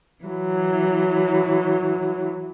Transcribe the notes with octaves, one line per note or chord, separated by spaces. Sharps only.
E3 F#3